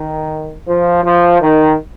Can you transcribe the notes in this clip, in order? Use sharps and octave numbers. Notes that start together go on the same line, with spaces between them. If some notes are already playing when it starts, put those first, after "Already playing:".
Already playing: D#3
F3
F3
D#3